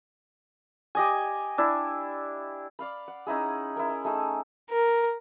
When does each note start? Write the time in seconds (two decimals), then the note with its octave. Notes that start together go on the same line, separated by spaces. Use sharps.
0.95 G4 D#5 G#5
1.58 D4 E4
2.79 D5 F5 B5
3.08 F#5
3.27 C#4 D#4 E4 G#4
3.76 E4 A#4
3.89 A#5
4.05 A3 D#4 G#4 E6
4.70 A#4